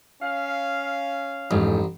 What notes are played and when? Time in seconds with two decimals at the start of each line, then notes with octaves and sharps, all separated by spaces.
0.22 C#4 F5
1.51 A1 F2 G#2